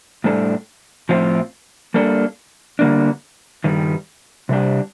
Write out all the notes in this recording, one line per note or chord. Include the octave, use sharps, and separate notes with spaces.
A2 G3 D4 A4
A2 F3 C4 F4
G3 A#3 D4 A4
D3 G3 A#3 D4
G2 D#3 G3
C3 G3 D4 G4